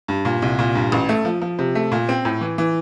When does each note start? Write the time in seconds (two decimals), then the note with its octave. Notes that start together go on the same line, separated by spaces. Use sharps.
0.08 G2
0.25 A#2
0.42 C2
0.59 A#2
0.75 G2
0.92 A1
1.09 A3
1.25 F3
1.42 F3
1.59 C3
1.75 A3
1.92 A#2
2.09 C4
2.25 A2
2.41 E3
2.58 E3